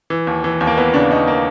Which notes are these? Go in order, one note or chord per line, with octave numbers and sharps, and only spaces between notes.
E3
D#2
E3
D#2
A#3
E3 B3
C#3 D4
D#2 D#4
A#3